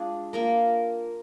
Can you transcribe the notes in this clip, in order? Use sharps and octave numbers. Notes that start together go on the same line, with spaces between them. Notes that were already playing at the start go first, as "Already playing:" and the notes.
Already playing: G#3 D4 F4 G#4
A#3 F4 A#4